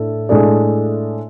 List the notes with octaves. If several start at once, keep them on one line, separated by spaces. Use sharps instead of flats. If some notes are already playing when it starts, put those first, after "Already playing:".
Already playing: A2 D4 A4
A2 G#3 D4 A4 D5